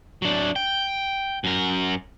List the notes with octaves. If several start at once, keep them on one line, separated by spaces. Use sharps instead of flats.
F#3 D4
G5
F#2 A#4